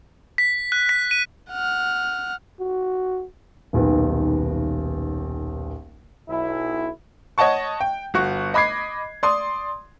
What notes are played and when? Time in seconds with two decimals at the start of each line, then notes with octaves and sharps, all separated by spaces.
0.38 B6
0.72 F#6
0.89 B6
1.11 D#7
1.51 F#5 F6
2.60 F#4
3.73 D#1 B1 D#3 B3
6.29 B1 E4
7.38 C#5 D#5 F#5 A5 C#6
7.81 G5
8.14 G1 F#4 C#6
8.54 D#5 B5 D6 G#6 C7
9.23 D5 C6 D#6